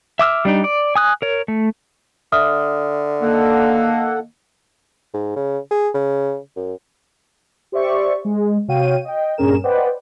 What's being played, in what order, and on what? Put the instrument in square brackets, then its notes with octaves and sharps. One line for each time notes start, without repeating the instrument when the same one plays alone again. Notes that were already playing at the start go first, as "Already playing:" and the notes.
[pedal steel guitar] E5 D6 E6 F6
G3 D4 D#4
D5
G#5 D#6 F#6
A#4 C#5
A3
[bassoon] D3 [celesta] E5 D#6 F6
[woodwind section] D#3 A#3 [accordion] A4 F#5
[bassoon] G#2
C#3
G#4
C#3
F#2
[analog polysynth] G4 C5 D5 E5 C#6
G#3
C3 F#4 C#5 F5 G5 D#7
D#5 G5
G2 A#2 C#4 G#4 A#4 E7
B4 C5 D5 D#5 F#5 G5